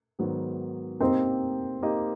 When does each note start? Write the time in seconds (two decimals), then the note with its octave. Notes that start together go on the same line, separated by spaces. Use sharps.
0.19 G#2 D#3 F#3 B3
1.00 A#3 C4 D#4 G4 A#4 C5 D#5
1.82 A#3 D#4 G4 A#4 D#5